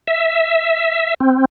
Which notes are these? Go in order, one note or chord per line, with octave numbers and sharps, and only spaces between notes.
E5
C4